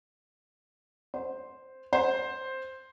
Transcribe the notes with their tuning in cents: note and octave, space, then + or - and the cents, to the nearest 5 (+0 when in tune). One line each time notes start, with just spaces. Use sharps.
C5 +0
C5 +5